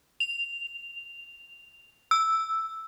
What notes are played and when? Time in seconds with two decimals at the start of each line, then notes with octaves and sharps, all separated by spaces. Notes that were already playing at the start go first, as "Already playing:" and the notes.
0.20 F7
2.11 E6